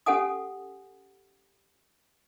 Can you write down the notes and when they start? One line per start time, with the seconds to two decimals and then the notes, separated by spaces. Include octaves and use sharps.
0.06 C#4 G4 A4 F#5 G#5 D#6